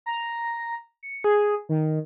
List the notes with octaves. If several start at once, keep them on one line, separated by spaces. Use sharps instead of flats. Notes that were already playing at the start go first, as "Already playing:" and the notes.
A#5
C#7
G#4
D#3